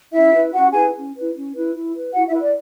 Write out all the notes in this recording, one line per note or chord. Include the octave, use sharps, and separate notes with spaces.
C#4 E4 E5
E4 B4
C#4 F#4 F#5
E4 G#4 B4 G#5
C#4
E4 B4
C#4
E4 B4
E4
B4
E4 F#4 F#5
E4 E5
B4
D5